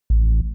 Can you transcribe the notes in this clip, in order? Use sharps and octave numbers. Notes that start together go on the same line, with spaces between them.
A1